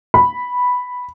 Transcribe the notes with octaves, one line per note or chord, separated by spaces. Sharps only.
B5